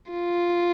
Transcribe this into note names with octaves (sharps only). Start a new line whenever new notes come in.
F4